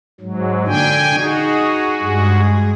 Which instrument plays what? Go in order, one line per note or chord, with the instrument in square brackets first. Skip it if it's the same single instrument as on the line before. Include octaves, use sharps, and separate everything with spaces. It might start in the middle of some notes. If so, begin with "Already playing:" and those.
[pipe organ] G#2 F#3
[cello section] A#2 D3 [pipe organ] G5 G#5
[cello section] D#4 G#4 [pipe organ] F#4
[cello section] G2 G#3 G#4